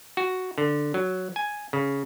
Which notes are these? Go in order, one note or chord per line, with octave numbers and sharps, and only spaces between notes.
F#4
D3
F#3
G#5
C#3